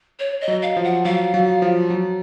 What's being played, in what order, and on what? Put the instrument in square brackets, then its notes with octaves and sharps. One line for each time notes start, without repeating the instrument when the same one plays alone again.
[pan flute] C#5
D#5
[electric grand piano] F#3
[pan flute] F5
[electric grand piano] F3
[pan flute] F#5
[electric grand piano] F#3 [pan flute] F5
[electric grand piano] F#3
F3
F#3